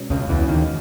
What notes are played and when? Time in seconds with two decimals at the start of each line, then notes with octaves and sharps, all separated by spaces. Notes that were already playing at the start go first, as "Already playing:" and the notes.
Already playing: B2 G#3 C#4
0.10 C#2 C#3
0.29 E2 E3
0.48 D#2 D#3